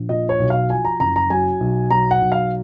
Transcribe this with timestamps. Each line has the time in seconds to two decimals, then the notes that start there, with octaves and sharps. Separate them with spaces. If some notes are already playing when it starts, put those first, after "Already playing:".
Already playing: A#1
0.09 A#2 D#5
0.29 C#5
0.40 B1
0.50 F5
0.70 F3 G#5
0.85 A#5
1.00 F#1 A#5
1.16 A#5
1.30 F#3 G#5
1.60 B1
1.91 F#3 A#5
2.11 F#5
2.22 B1
2.32 F5